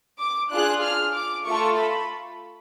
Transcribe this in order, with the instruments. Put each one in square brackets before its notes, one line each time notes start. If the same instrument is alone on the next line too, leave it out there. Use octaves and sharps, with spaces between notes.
[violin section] D6
D4 F4 G#4 F#6
F6
D6
A3 F4 A4 C#6
B5